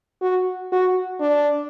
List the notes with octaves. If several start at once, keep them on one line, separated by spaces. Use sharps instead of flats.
F#4
F#4
D4